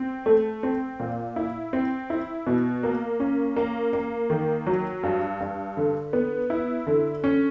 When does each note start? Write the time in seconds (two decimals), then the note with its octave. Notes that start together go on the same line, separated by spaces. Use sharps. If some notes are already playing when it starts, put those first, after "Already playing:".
Already playing: C4
0.26 A3
0.63 C4
1.00 A#2
1.36 E4
1.73 C4
2.10 E4
2.47 B2
2.83 A#3
3.20 C#4
3.56 A#3
3.93 A#3
4.30 D#3
4.67 F#3
5.03 G2
5.40 G2
5.77 D3
6.13 B3
6.50 E4
6.87 D3
7.24 C#4